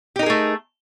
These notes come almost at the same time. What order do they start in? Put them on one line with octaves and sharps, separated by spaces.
G4 D#4 A#4 G#4 A3